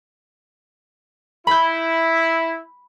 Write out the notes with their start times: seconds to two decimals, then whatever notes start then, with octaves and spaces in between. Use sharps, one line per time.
1.47 E4 B5 G6